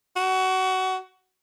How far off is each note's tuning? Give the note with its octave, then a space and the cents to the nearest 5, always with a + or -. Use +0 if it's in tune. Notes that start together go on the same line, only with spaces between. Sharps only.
F#4 +20